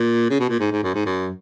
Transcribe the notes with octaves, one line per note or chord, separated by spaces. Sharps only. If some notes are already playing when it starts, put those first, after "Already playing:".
Already playing: A#2
C#3
B2
A#2
G#2
G#2
F#2
G#2
F#2